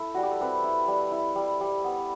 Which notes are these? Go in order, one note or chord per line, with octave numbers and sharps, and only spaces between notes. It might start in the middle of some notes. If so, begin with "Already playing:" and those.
Already playing: E4 A4
G3 F#4
G4
A4
C4 G4 B4
E4
G3
E4
G3
G3
B3